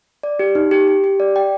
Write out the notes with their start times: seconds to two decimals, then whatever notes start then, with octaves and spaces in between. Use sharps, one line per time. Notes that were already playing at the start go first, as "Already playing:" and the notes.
0.23 D5
0.39 G4
0.55 D#4
0.71 G4
0.88 G4
1.04 G4
1.20 D5
1.36 G5